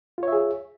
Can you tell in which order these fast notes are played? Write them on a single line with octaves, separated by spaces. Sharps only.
F4 C#5 E5 G#4